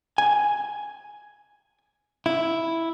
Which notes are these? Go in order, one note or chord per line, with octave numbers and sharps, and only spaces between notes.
G#5
E4